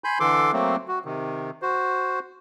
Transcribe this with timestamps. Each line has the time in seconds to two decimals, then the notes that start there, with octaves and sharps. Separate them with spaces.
0.04 G#5 B5 C6 G6
0.20 D3 E3 A4 C6 D6
0.53 F#3 A3 A#3 C4
0.88 F#4
1.05 C3 D#3
1.62 F#4 C5